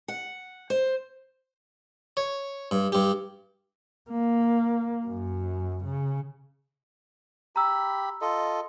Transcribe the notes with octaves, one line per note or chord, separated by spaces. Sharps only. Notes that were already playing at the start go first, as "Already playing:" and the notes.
F#5
C5
C#5
G2
G2 G4
A#3
F#2
C#3
G4 A#5 B5 E6
F4 A4 D#5